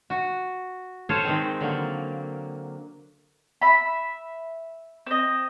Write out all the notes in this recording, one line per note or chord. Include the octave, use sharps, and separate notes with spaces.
F#4
A4 C5 C#5 F5 G#5
D#3 G#3 C4
D3 F#3 A#3
E5 B5
C4 D#5